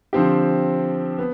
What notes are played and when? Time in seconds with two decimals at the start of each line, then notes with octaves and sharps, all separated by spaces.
0.13 D3 F3 C4 G4
1.19 B3